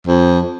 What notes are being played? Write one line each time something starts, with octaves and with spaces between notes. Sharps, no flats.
F2